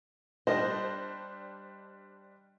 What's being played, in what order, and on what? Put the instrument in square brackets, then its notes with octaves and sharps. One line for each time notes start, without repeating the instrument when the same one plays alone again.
[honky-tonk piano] G3 D4 C5 [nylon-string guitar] D#5